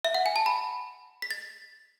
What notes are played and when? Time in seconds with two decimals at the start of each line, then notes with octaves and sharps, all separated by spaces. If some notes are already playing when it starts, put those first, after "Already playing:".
0.05 E5
0.14 F#5
0.26 G#5
0.36 A5
0.46 B5
1.22 B6
1.31 A6